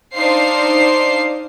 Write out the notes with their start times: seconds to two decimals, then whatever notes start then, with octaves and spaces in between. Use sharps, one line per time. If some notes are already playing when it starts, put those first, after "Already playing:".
0.15 D4 D#4 C5 F5 C7